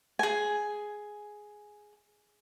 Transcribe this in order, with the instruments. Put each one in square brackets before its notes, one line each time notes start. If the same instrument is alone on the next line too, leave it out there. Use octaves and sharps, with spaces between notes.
[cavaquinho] G#4 G#5